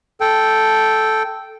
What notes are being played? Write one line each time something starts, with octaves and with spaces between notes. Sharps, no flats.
A4 G5